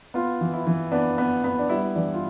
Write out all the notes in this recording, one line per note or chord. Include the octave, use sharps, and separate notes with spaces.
B3 F4
E3
E4
E3
B3 D4
B3
B3
D4
G3 E4
E3 D4
F4